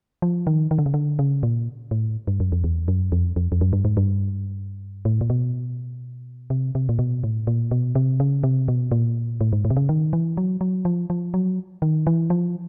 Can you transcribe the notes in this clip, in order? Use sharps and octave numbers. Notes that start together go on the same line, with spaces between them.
F3
D#3
D#3
D3
C#3
D3
C#3
A#2
A2
G2
F#2
F2
E2
F#2
F2
F2
F2
F#2
G2
G#2
G2
A2
A#2
B2
C3
C3
A#2
B2
A2
A#2
B2
C3
C#3
C3
B2
A#2
A2
G#2
A2
C3
C#3
D#3
E3
F#3
F#3
F3
F3
F#3
D#3
E3
F3